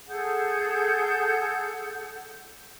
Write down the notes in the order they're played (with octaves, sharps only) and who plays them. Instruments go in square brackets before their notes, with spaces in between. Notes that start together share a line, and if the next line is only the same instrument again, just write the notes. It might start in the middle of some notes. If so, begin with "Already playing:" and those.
[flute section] G#4 A4 F#5 G6